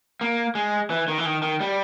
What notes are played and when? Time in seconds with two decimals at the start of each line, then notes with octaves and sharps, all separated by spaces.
0.21 A#3
0.55 G#3
0.90 E3
1.08 D#3
1.18 E3
1.25 D#3
1.42 D#3
1.60 G3